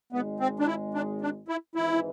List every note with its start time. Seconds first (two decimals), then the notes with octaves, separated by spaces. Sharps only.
0.13 G#1 G#2 G#3 B3
0.40 C4
0.60 D4
0.67 E4
0.94 D4
1.21 D4
1.48 E4
1.76 G#1 G#2 E3 E4